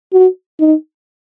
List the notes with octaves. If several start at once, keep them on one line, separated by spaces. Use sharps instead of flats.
F#4
D#4